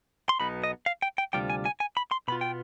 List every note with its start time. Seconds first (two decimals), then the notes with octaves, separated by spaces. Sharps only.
0.29 C6
0.40 B1 B2 B3 D#4 B5
0.64 D#5
0.86 F5
1.02 G5
1.18 G5
1.33 D2 C3 G3 D4 F4 G5
1.50 G#5
1.66 G#5
1.80 G#5
1.97 B5
2.11 C6
2.28 B2 B3 F4 B5
2.41 G5